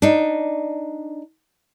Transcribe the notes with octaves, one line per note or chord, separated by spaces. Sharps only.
D4 D#4